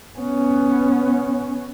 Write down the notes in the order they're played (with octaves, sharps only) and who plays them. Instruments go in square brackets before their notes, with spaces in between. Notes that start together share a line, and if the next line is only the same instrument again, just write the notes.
[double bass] B3 C#4